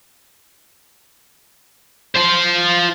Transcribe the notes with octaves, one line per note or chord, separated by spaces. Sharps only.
F4 C5